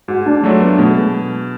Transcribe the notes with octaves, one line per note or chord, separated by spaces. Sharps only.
G#2 F#4
D4
F#3 A3 C#4 D4 F4
B3
B2 A3
G#3